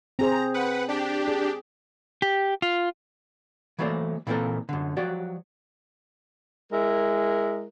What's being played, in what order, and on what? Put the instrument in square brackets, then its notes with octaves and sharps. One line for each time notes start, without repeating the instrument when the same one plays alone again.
[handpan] C4 G#4 C5 [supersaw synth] A#5
[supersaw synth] B4 F#5
D4 G4
[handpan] G#4
[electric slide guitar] G4
F4
[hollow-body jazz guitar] E3 F#3 A3 A#3 C5 D5
A#2 E3 A#3 C4 A4 A#4
F#2 D3
F3 F#3 F#4 G4 D5
[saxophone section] G#3 E4 A#4